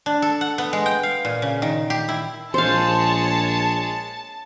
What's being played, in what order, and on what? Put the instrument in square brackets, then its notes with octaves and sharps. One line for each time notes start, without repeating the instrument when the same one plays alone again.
[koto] D4
A4
F#5
B3
G#3
G5
F5
A#2
C#3
D#3
G4
E4
[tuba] A#1 [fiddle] G#3 C#5 [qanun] C5 F5 [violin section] A5